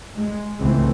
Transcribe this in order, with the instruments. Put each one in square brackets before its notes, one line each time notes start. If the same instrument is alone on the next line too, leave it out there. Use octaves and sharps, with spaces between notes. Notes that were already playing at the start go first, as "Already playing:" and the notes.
[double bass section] G#3
C#2 E3 A3 C4